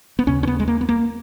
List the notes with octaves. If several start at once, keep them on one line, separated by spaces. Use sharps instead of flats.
B3
D#2 C#3 C#4
C#4
B3
G#3
A#3
B3
A#3